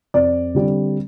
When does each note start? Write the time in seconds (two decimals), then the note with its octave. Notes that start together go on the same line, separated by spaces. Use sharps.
0.14 F2 D5
0.55 D3 G3 C4